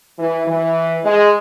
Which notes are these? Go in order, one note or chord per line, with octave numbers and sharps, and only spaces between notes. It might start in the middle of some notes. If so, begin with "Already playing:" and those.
E3
E3
G#3